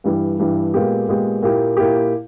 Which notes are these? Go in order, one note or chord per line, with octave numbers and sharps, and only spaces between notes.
G2 E3 G3
G2 E3 G3
A#2 G#3 B3 G4
A#2 G#3 B3 G4
A#2 A#3 E4 G4
A#2 A#3 E4 G4